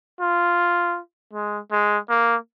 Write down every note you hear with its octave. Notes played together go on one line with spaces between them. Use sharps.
F4
G#3
G#3
A#3